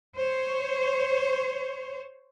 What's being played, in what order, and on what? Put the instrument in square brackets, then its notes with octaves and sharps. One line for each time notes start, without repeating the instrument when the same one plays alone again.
[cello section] C5 C#5